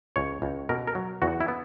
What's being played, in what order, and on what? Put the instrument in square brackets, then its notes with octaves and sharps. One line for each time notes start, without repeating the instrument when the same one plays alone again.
[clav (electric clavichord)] C#2 C#5
C#2
B2 A#4
A#4
F#3
E2 F#4
E4
B3